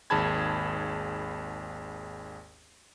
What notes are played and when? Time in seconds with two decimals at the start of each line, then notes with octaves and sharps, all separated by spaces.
0.10 G#1 D#2 G#4 A5 B5 G#6